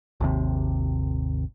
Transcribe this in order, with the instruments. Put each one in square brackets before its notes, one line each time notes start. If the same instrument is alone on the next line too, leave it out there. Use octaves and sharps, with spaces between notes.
[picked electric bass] G#1 D#2 C3